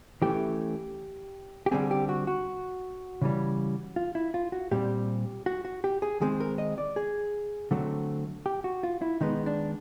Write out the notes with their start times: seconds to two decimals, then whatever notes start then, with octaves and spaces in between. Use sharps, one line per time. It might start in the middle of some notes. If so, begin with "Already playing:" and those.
0.22 E3 A3 C#4 G4
1.66 G4
1.71 D3 G3 C4 G#4
1.91 G4
2.09 F#4
2.27 F#4
3.22 C#3 E3 G3
3.96 F4
4.15 E4
4.34 F4
4.52 F#4
4.71 A#2 G3 C4 G4
5.46 F#4
5.65 F#4
5.84 G4
6.02 G#4
6.21 D#3 G#3 C4 G#4
6.40 A#4
6.58 D#5
6.78 D5
6.96 G#4
7.71 D3 F#3 A3 C4
8.46 G4
8.64 F#4
8.83 F4
9.02 E4
9.21 D#3 G#3 B3 D#4
9.46 D4